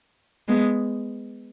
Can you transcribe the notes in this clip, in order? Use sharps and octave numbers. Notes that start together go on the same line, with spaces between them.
G#3 B3